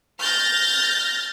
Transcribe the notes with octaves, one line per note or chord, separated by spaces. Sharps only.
F6 G6 A6 A#6